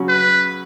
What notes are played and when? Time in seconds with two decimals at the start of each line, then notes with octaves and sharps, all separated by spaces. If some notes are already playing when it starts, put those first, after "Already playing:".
Already playing: C#3 F#3 C#4 F#4
0.08 B4